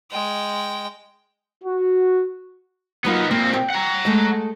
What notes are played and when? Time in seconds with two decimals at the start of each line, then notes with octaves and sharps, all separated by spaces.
0.11 G#3 G5
1.64 F#4
3.05 F#3 A#3 B3 D#4 F4
3.31 A#2 A#3 C4
3.53 G5
3.70 F#5 A#5
4.05 G#3 A3 D#5